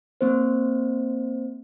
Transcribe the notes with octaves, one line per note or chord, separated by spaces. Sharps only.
A#3 C4 C5